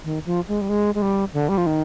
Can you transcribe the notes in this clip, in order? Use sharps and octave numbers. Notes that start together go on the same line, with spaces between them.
D#3
F3
G#3
G3
G#3
G#3
G3
D3
G3
F3
D#3